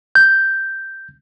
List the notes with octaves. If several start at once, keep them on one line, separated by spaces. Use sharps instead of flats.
G6